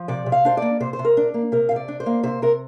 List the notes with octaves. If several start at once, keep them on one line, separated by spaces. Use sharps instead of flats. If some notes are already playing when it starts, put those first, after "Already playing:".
Already playing: F3
C3 D5
C3
F5
D4 C5
A#3 D5
C3 C5
C5
C3
A#4
D4
A#3
C3 A#4
C3 F5
D5
D4
C5
A#3
C3 C5
C3 A#4